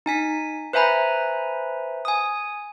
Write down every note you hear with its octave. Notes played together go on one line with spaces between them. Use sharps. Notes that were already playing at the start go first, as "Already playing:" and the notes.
D#4 G#5 B6
B4 C5 E5 G#5 A#5 B5
G#5 D#6